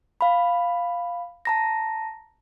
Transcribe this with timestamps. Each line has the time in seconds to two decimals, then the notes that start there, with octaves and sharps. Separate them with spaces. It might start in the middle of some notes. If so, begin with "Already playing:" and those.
0.21 F5 B5
1.45 A5 A#5 A#6